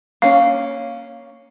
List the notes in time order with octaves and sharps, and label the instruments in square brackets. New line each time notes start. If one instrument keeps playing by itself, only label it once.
[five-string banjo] A#3 C#4 [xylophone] F5